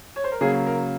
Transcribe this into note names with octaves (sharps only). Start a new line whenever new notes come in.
C#5
C5
A#4
C#3 F#3 A#3 G#4
A#4